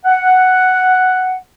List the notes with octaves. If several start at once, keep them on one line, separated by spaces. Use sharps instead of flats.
F#5